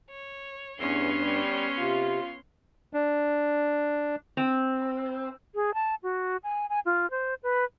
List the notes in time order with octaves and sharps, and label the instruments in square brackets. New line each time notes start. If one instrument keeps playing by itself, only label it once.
[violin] C#5
[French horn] E2 [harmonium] G2 [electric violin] B3 C#4 [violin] C#5 C6
[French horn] G3
[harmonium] C3 [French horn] F4
[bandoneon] D4
[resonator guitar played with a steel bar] C4
[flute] G#4
A5
F#4
G#5
G#5
F4
C5
B4